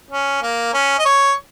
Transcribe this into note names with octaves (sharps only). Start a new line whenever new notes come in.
C#4
A#3
C#4
D#5
C#5